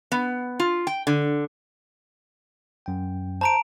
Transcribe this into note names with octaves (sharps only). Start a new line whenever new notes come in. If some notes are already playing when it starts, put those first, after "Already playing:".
B3
F4
G5
D3
F#2 G5
C5 A5 A#5 D7